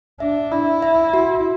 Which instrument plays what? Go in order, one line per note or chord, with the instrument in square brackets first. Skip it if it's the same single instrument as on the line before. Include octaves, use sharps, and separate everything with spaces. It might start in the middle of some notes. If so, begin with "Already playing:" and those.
[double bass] D4 [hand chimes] E5
[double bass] E4 [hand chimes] E5
[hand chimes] E5
F#4